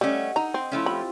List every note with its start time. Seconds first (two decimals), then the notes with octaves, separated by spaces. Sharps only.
0.01 G3 A3 C#4 D#5 F#5
0.36 D#4 A#5
0.54 C4
0.71 F3 A3 C#4 E4 F5
0.86 C4 F4 G4 B5